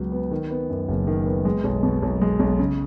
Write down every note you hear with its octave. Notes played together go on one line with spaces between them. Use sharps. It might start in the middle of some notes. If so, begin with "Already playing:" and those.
Already playing: C#2 C#3 F#3 B3
B3
D#3
B3
F#2
F#1
D#3
B3
G#3
B1
B2
B1
G#3
B1
C#3